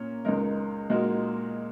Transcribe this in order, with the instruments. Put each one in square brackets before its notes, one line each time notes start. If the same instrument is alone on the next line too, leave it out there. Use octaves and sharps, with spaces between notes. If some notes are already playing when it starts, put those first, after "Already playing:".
Already playing: [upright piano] A#2 A#3 C#4 C#5
C#2 C#3 G#3 D#4 A#4
A#2 G#3 D#4 F#4 A#4